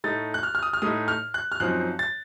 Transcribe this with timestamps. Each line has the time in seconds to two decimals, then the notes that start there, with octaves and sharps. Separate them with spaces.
0.04 A2 A3 D#4 A6
0.34 F#6
0.43 F6
0.55 F6
0.63 D#6
0.73 F6
0.82 A2 A3 D#4 D#6
1.08 F6
1.34 F#6
1.52 F6
1.60 F#2 F3 C4 D#4 F#6
1.99 A6